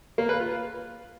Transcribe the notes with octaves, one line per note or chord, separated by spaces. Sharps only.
A#3
B4
F4